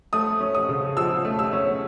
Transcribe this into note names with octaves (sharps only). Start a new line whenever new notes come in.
A3 D#6
C#4
D#6
C#3
F3 E6
A3
E6
C#4